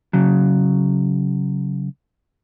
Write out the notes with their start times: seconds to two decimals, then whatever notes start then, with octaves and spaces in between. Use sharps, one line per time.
0.13 C#3 F#3